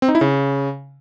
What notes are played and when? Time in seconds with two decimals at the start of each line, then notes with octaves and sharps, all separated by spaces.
0.02 C4
0.08 D#4
0.15 E4
0.21 C#3